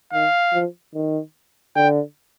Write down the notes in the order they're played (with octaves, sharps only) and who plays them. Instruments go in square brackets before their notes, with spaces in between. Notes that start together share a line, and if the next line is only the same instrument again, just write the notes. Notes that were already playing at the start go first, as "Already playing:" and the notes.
[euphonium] D#3 [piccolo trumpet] F5
[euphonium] F3
D#3
[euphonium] D3 [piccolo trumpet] G5